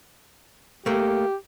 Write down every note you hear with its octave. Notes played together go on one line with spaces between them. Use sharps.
A3 A#3 G4